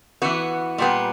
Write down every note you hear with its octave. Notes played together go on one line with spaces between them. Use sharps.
E3 B3 F#4
A#2 G3 B3